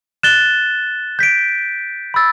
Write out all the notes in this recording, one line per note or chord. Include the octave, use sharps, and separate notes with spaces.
F#6 A6 E7 G7
G6 B6 D7
B5 E6 A6